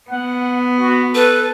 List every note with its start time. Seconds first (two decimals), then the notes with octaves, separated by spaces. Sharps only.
0.11 B3 F#5
0.81 F#4
1.15 A4 B4